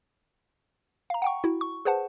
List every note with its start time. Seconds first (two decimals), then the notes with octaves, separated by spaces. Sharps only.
1.10 F5 A#5
1.22 F#5 G5 C#6
1.44 E4 F#4
1.61 C#6
1.85 G#4 B4 C5 F#5 A5